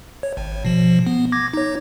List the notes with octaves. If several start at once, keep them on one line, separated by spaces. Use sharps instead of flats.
C#5
G#1
B2 F3
B3
D6 G#6 A#6
D#4 C#5